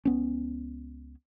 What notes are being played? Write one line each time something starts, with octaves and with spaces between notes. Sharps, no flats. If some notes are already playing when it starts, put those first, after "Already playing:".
C#2 B3 C#4